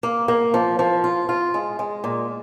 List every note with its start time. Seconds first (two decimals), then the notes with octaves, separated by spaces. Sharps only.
0.03 A#3
0.28 A#3
0.54 F3
0.79 F3
1.04 F4
1.29 F4
1.54 G#3
1.79 G#3
2.04 A#2